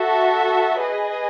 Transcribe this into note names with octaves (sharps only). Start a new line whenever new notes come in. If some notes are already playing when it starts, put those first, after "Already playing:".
Already playing: F#4 A4 E5
G#4 B4 D#5 G#5